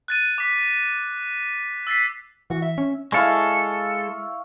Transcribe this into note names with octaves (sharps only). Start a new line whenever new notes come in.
F#6 A6 D#7
D6 B6
E6 A6 B6 C7
E3 F#4
E5
C#4
G#3 E4 A4 F5 C#6